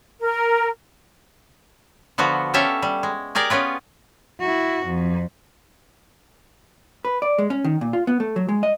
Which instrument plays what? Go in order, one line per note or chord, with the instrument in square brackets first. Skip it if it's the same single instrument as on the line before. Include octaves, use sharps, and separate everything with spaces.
[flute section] A#4
[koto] D3 F3 B3 F#4
C#4 G4 A4 E5 F5
G3
G#3
G4 G#4 A#4 D5
B3 C#4 F4 B4
[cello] E4 F#4
F2
[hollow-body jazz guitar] B4
D5
G#3
C#4
D#3
A#2
F4
B3
A3
F#3
G#3
D#5